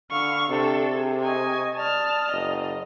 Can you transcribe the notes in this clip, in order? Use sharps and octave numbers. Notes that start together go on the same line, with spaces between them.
D3 F5 B5 C#6 E6 F6
C3 D4 A4
G#4
D#5 G#5 C#6 D#6
D5 A5 D#6 F6
F#1 D#5